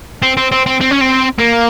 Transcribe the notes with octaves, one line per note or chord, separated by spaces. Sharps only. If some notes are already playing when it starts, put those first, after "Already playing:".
C4
C4
C4
C4
C4
C#4
C4
A#3